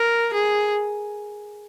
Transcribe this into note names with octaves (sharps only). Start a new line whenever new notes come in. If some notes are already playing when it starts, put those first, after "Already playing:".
Already playing: A#4
G#4